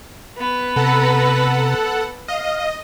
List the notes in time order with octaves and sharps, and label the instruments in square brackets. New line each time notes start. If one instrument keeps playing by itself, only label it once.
[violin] B3 B4
[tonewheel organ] C3 A#5 [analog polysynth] A4 F#5
[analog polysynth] D#5 [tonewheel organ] F5